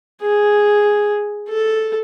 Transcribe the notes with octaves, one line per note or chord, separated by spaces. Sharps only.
G#4
A4